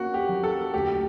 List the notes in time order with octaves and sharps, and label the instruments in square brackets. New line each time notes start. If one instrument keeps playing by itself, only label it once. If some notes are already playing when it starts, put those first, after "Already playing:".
Already playing: [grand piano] A#3 C#4 [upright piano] F#4
[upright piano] G4
[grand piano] F#3
[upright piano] A4
[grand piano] D2 [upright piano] G4